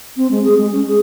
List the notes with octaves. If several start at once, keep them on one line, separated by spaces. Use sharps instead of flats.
C4
G#3
G#4
G#3
C#4
G#4